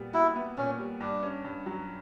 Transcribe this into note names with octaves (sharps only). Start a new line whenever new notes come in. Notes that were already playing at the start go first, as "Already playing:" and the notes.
Already playing: A#2 G3 B3
E4 F#4
B3
A#2 C#4
G3
G2 D4
C#4
G2
F#3